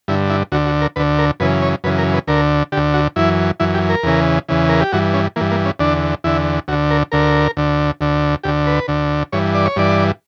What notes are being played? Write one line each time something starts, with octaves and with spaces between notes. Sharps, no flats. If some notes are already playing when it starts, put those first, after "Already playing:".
G2 D3 E4
E4
D2 D3 F#4
F#4
A#4
D2 D3 B4
A#4
F#2 C#3 E3 B4
C#5
F#2 C#3 E3 B4
A#4
B4
D2 D3 A#4
D2 D3 G4
F#4
F#2 E3 E4
F#2 E3 E4
G4
A#4
E2 C#3 E3
E2 C#3 E3
A#4
G4
G2 E3 F#4
C#4
G2 E3 A#3
A#3
C#4
E2 D3 D4
E2 D3 E4
D2 D3 F#4
A#4
D2 D3 A#4
D2 D3
D2 D3
D2 D3 G4
B4
D2 D3
G2 E3 C#5
D5
C#5
G2 E3 D5